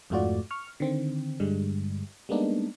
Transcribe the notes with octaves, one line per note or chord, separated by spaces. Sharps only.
F2 G#2 A3 F4 F#4 D5
C#6 F6
D3 D#3 C4
G2 D3 G3 G#3
G3 G#3 A#3 B3 D4 D#4